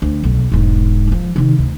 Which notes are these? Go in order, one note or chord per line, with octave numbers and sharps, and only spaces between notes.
D2
B1
E1 G#2
E3 F3
C3 D#3
D2